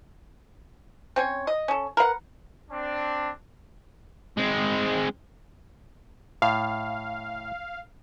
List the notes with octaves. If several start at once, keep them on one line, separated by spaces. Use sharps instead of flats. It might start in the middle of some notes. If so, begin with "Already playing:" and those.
C4 C#4 C#5
D#5
C#4 A4
A#4 B4 F5 F#5
C4 D4
G#3 C4
A2 F5